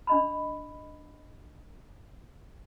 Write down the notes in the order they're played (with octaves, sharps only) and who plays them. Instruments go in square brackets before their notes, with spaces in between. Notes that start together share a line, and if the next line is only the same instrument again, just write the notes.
[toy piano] D4 D#5 B5